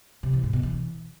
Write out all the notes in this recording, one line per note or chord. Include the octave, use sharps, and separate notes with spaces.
C3
E3
G#2
B2
E3